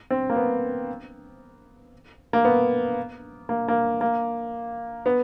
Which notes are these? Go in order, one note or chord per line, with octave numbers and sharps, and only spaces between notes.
C4
A#3
B3
A#3
B3
A#3
A#3
A#3
B3